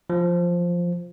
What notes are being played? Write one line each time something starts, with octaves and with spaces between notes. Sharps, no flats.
F3